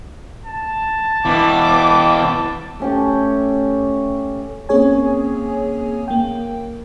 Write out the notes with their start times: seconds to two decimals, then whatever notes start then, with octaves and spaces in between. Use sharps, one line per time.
0.46 A5
1.25 B2 E3 B4 D6
2.79 A3 C#4 G4
4.69 A#3 C4 C#4 G#4 C#5 G#5
6.08 A#3 G5